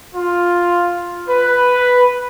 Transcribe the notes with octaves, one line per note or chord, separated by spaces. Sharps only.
F4
B4